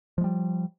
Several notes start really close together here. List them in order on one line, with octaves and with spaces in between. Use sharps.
F3 G#3 G3